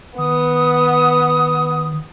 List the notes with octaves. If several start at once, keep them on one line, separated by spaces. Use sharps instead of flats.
D#3 B3 D#6